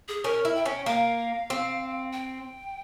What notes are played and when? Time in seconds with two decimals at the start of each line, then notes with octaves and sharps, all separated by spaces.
0.08 G#4
0.24 C#4 A#4
0.45 E4
0.55 G5
0.65 C#4
0.86 A#3 F5
1.50 C4
2.13 G5